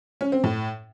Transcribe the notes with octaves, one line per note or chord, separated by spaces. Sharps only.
C#4
C4
A2